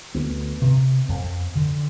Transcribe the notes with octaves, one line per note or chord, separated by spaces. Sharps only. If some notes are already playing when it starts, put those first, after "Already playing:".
D2 B3
C3
F2
D3